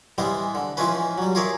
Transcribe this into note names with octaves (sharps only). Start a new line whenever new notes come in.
E3 G3 G#3 B3 C4
D3
E3 F3 G#3 C4 C#4 B4
F#3 G3
F4 G#4 A#4 C#5 D5 E5